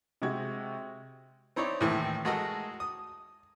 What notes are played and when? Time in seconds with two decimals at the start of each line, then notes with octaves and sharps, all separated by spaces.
0.22 C3 G#3 F#4 G#6
1.56 C4 D#4 E4 C#5 D5
1.80 D#2 A2 C3 D#3 E3 A3
2.25 G#3 A3 F#4 A4 A#4 D#5
2.80 D#6